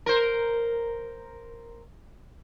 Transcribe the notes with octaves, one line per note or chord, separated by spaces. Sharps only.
A#4 C5